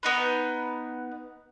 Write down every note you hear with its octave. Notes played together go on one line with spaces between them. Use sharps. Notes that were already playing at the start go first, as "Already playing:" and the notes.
B3 D#4 B4